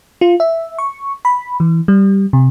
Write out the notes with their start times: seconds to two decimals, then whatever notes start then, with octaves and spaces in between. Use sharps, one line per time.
0.21 F4
0.40 E5
0.78 C#6
1.25 B5
1.60 E3
1.88 G3
2.33 C3